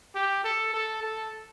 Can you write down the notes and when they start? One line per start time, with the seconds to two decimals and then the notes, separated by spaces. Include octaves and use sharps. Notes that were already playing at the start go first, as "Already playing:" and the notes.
0.15 G4
0.44 A4
0.74 A4
1.03 A4